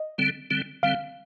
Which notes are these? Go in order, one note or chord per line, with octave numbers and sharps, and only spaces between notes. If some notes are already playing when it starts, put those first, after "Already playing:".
Already playing: D#5
D3 G3 C4
D3 G3 C4
D3 G3 C4 F5